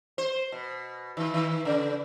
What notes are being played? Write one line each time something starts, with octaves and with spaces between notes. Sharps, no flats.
C5
B2
D#3
D#3
C#3